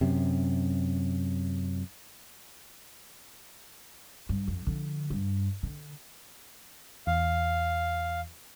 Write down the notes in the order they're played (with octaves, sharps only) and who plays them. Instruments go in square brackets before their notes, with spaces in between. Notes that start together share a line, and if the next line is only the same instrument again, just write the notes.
[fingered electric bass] F#2 C3
[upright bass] G2
F2
D3 F3
G2
D3
[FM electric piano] E2 [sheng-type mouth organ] F5